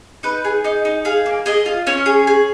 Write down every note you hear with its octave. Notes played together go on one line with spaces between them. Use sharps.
D#4 B4
G#4
D#4 D#5
D#4
G#4 F5
A#3
G#4 D#5
F4
C#4 C#5
G#4
G#4